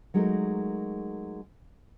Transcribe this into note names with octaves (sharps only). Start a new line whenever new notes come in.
F#3 G#3 A3 D#4 A#4